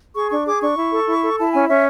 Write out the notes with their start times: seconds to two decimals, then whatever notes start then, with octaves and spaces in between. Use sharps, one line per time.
0.15 G#4 C#6
0.30 D4 C#6
0.46 G#4 D6
0.61 D4 C#6
0.77 E4
0.92 A4
1.07 E4
1.22 A4
1.38 E4 A5
1.53 C#4 G#5
1.68 C#4 E5